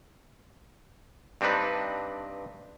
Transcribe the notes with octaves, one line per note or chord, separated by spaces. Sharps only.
G2 C4 D4 D#4 B4